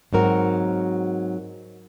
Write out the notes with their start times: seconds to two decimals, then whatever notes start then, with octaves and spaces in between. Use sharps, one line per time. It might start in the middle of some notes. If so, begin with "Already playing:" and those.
0.13 G#2 F#3 C4 F#4 A#4